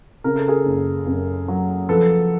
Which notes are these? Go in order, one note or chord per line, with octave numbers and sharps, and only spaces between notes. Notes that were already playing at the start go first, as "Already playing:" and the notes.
C#3 A#4
A4
G#4 A#4
F#1
F#2
F#3
F3 A4 B4